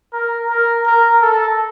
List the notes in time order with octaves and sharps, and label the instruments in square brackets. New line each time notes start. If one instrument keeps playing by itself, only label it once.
[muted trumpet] A#4
A#4
A#4
A4